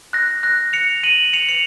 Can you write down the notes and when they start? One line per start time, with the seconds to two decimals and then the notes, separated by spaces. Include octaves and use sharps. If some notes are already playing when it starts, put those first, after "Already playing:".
0.13 F#6 A#6
0.43 F#6 A#6
0.73 C#7 F7
1.03 D#7 F#7
1.33 C#7 F7
1.48 C#7 F7